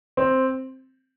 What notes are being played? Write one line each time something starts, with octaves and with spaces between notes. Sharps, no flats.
C4